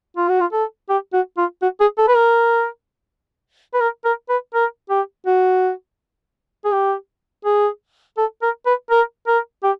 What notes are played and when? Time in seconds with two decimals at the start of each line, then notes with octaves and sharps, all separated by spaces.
0.17 F4
0.28 F#4
0.40 F4
0.53 A4
0.89 G4
1.13 F#4
1.38 F4
1.62 F#4
1.80 G#4
1.98 A4
2.08 B4
2.16 A#4
3.74 B4
3.80 A#4
4.05 A#4
4.29 B4
4.54 A#4
4.90 G4
5.26 F#4
6.65 G#4
6.72 G4
7.45 G#4
8.17 A4
8.42 A#4
8.66 B4
8.90 A#4
9.27 A#4
9.64 G4